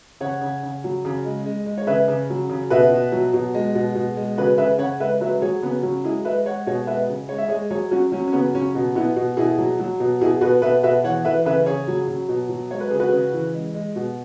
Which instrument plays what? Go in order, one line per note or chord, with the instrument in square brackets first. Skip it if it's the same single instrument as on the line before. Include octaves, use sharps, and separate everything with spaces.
[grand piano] C#3 C#5 F#5
C#3
C#3
F#3
C#3
G#3
G#3
G#3
C#5
C#3 B4 E5
C#3
F#3
C#3
B2 B4 E5
B2
F#3
B2
G#3
B2
B2
G#3
C#3 F#4 B4
C#3 B4 E5
C#3 C#5 F#5
G#3 B4 E5
F#3 B4 E5
F#3 G#4 C#5
C#3 B3
F#3 C#4
G#3 E4 G#4
G#3 B4 E5
G#3 C#5 F#5
B2 G#4 C#5
G#3 B4 E5
C#3
G#3 C#5
E5
G#3 G#4 C#5
F#3 G#4 C#5
F#3 C#4 F#4
F#3 C#4
C#4
C#3 B3
F#3 C#4
B2
B2 B3 E4
B2
B2 E4 G#4
F#3
F#3
B2
B2 E4 G#4
B2 F#4 B4
B2 B4 E5
B2 B4 E5
E3 C#5 F#5
E3 B4 E5
C#3 B4 E5
C#3 G#4 C#5
F#3
F#3
B2
F#3
G#3 C#5
B4
C#3 G#4
F#4 B4
C#3
E3
G#3
G#3
B2